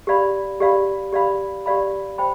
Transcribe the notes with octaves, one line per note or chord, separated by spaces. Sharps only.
G4 D5 F5 B5
G4 D5 F5 B5
G4 D5 F5 B5
G4 D5 F5 B5
C5 G5 B5